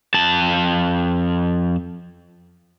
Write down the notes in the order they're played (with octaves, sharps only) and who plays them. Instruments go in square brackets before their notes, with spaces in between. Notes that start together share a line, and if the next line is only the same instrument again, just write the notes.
[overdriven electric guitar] F2 A5